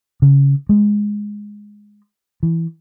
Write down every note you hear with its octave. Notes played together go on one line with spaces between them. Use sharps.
C#3
G#3
E3